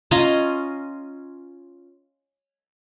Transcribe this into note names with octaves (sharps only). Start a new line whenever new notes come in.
C#4 F4 D#5 A#5